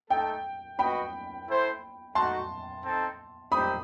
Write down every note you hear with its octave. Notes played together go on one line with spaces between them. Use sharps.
A3 D#4 A4 G5
F#4 B4 D#5 G5 B5
E4 A4 C5 E5
A3 D#4 F#4 A5 C6
C4 D#4 A4
G3 C4 D#4 G4 C5 B5 D#6